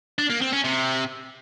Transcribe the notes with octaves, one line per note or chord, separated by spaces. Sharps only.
D4
A#3
C4
C#4
C3